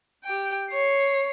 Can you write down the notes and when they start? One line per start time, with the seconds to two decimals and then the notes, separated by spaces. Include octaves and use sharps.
0.24 G4 G5
0.71 C#5 C7